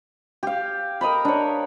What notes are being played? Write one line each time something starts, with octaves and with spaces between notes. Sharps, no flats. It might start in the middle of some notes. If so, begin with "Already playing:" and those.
G4 F5
A#4 D#5 A#5 B5
D4 C#5